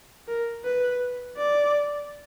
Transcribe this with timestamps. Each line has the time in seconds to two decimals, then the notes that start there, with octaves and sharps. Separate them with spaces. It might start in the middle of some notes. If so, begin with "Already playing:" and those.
0.28 A#4
0.65 B4
1.37 D5